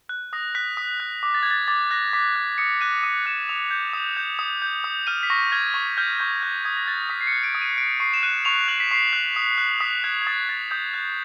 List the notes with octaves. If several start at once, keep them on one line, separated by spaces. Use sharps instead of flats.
F#6
D#6 A#6
F#6 B6
D#6 B6
F#6
D6
A6
G#6
F#6 A6
D6 A6
F#6 A#6
D6 B6
F#6
D#6 C#7
F#6 D#7
D#6 D#7
F#6 E7
D#6 F7
G6
D#6
G6
D#6
G6
D#6
F6 D#7
B6
C#6 A#6
F6 G#6
C#6
F6 G6
C#6 G6
F#6 G#6
D#6 G#6
A#6
F#6 A6
D#6 B6
C7
C#7
F#6
D7
D#6
D#7
F#6 D7
C#6 C7
E7
F#6 D#7
C#6 F7
F#6 F#7
B6
C#6 C7
F#6
D#6
F#6
D#6 B6
F#6 G#6
G#6
D#6 A6
F#6 A6
D#6 G6
F#6 G#6